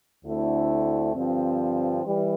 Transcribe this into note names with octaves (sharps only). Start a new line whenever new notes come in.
D2 D3 A3 C4 E4
G2 D3 F3 C4
E3 G3